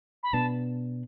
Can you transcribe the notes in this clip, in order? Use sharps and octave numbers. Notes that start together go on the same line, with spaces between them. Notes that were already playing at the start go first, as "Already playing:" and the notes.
B5
B2 B3 D4 A5